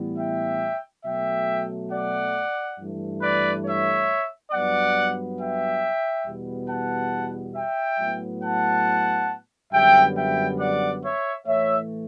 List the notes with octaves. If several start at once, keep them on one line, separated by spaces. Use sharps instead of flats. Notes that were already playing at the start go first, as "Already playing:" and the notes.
Already playing: A2 E3 G3 B3
E5 G5
B2 F#3 A3 E5 G5
D5 F#5
G2 E3 A3
B4 D5
C#5 E5
G2 F#3 B3 D5 F#5
E5 G5
E2 B2 G3 B3
F#5 A5
E5 G5
A2 F#3 B3
F#5 A5
F#2 D3 G3 B3 E5 G5
E5 G5
D5 F#5
C#5 E5
A2 E3 A3 C#5 E5